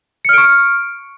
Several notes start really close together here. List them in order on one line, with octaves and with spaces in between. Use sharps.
C#7 F6 D7 C#6